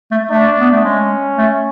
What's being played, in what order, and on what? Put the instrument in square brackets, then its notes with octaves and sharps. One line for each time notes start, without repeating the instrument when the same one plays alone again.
[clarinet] A3
[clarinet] A3 [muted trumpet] D4
[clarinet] B3
A3
[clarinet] G#3 [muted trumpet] C#4
[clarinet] A3